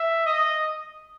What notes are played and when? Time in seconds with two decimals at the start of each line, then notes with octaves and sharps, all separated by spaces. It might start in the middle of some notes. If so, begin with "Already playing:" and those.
Already playing: E5
0.26 D#5